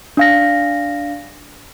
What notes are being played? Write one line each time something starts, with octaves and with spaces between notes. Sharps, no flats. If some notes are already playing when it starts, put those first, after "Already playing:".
D4 F5 A#6